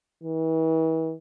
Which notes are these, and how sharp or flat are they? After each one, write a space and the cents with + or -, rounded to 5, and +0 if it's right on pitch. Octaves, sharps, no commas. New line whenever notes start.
E3 -40